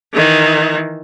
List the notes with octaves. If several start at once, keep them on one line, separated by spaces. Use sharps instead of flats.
D#3 E3